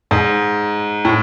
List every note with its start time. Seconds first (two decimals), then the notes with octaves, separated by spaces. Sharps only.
0.11 G#2
1.05 A2